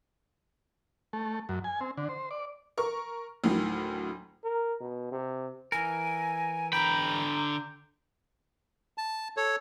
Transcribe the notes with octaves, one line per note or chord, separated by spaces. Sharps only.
A3
F#2
G#5
C4
D3
C5
D5
A#4 C#6
D2 A2 D#3 F#3
A#4
B2
C3
E3 A#4 G#5
D3 G5 A#5 B5
A5
A4 C#5